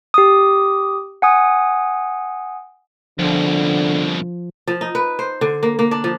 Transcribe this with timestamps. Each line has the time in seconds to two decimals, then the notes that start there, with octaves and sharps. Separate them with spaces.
0.14 G4 D#6
1.22 F#5 G#5 D#6
3.19 C2 B2 D3 F3
4.67 F3
4.81 D#4
4.95 B4
5.19 C5
5.41 D3
5.63 A#3
5.79 A#3
5.91 D4
6.04 F3